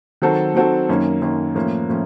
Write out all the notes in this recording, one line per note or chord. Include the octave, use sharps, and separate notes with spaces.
D#3 F#3 C4 F#4 A4
D#3 F#3 C4 F#4 A4
F#2 D#3 A#3 C#4
F#2 D#3 A#3 C#4
A2 F3 A#3 C#4
A2 F3 C#4